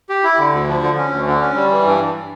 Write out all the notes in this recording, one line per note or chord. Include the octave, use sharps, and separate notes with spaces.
G4
E4
D3
D2
F3
D3
C#4
D2
D3
C#4
G3
E3
G2
G2